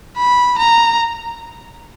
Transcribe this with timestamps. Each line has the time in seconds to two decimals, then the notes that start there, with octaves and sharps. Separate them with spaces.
0.17 B5
0.58 A#5